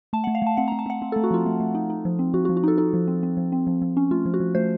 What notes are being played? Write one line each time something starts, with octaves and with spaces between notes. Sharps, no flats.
A3 A5
F#5
A3
F5
A3 A5
C4 F#5
A#5
C4
A5
C4 F#5
C4
A4
A3
F#4
F3 F4
A3
A3
D#4
D#4
F3
C4
F3 F#4
F#4
F3
F#4
D#4 A4
D#4 A4
F3
C4
C4
F3
C4
F3
F3
C#4
A3 F4
F3
F#4
F3
A3 C5